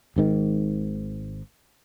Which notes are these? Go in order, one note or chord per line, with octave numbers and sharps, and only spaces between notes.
G#1 G#2 D#3